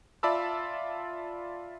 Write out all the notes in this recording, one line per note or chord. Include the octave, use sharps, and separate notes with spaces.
F4 D5 E5 A5 B5 E6